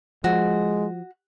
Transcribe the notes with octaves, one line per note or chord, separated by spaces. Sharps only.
F3 G#3 F#4